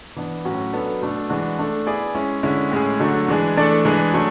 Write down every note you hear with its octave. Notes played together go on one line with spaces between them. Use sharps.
E3 B3 D4
A2 F#3 C#4 F#4
F#3 B3 D4 A4
B2 A3 D4
E3 G#3 D4 F#4
A3 D4 A4
B3 E4 G#4 B4 D5
G#3 C#4 E4
D3 G#3 C#4 E4
A2 G#3 C#4 G#4
D3 F#3 A3 D4
E3 G#3 D4 G#4
E3 A3 D4 A4 D5
E3 G#3 D4 G#4
F#3 A3 D4